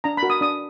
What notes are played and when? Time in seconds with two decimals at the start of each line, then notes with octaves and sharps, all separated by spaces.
0.04 D4 A#5
0.17 B5
0.23 F#4 A#4
0.30 D#6
0.41 D4 D#6